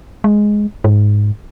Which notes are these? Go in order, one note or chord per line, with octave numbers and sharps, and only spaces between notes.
G#3
G#2